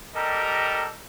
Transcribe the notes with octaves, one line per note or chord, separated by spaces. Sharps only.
G3 G4 A4 A#4 D#5 A#5